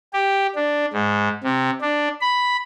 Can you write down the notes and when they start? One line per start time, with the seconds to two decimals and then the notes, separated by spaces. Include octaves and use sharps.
0.14 G4
0.56 D4
0.93 G#2
1.44 C3
1.81 D4
2.21 B5